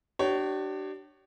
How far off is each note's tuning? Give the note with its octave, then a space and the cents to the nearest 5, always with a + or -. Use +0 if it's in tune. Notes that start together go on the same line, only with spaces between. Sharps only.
D4 +20 G4 -40 C#5 +0